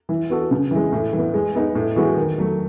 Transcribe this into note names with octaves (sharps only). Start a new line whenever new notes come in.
E3
B3 F#4 A4
C#3
E3 G#3
A2
E3 B3
G#3
B3 D#4 G#4
A2
E3 G#3 B3 F#4
D#3
F#3 A3